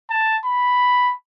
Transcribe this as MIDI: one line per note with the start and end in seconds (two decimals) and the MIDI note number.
0.10 0.37 81
0.45 1.12 83